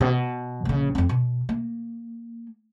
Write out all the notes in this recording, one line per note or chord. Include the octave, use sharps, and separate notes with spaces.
B2
A#1 C#3
F2 C4
B2
A#3